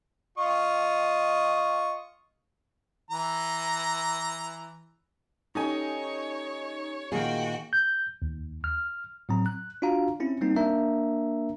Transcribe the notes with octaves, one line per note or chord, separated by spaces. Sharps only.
F4 D#5 C#6
E3 A#5
C#4 D#4 G4 A4 C#5 D#5 G#5
A#2 D#3 A#3 F4 F#4 G#4 G5
G6
D#2
F6
A2 F#3 C4 A#5
F#6
D4 F4 F#4 F5 A#5
C4 C#4 E4
G3 A#3 C4 D#4
A#3 D4 A#4 E5 A#5